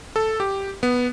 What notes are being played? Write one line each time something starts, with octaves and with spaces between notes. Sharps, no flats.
A4
G4
B3